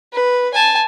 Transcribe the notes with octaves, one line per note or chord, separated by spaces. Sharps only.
B4
G#5 A5